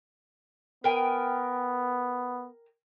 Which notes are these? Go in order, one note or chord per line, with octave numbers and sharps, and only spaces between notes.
B3 A#4 G5 G#5